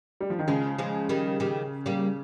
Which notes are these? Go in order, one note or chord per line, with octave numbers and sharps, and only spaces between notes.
G3
F3
D#3
C#3 F3 G#3
F3 G#3
D#3 G3
D#3 G3
G3 A#3